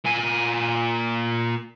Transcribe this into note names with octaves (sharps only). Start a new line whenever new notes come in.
A#2 G#5